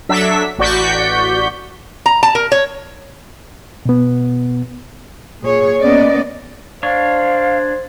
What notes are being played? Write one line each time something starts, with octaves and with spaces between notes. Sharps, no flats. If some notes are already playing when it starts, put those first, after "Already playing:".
F#3 D4 A4 E5 B6
A1 F#4 D5 C#6 G6 B6
A#5
A5
A#4
C#5
B2 B3
A#2 G#4 C#5
A#3 B3 C#4 D5 D#5
D4 C5 C#5 F5